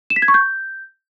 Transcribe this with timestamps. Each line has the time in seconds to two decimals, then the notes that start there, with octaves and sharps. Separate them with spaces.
0.10 E7
0.16 B6
0.22 G#6
0.28 C#6
0.34 G6